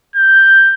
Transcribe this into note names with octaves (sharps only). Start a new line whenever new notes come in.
G6